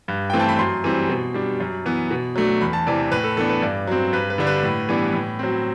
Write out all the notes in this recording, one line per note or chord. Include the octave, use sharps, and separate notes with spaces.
G2
E3 A3 C4 G5
A5
B5
F#2 C6
E3 G3 C4
B2
G3 D4
F#2
E3 B3
B2
F#3 A3 D4
E2 B5
A5
C3 E3 D5
A2 B4
A4
E3 B3 D4 A4
B4
G2 D5
F#3 C4
G2 B4
B4
D3 G3 D4
B4
A2
E3 G3 B3 D4
A2
F#3 C4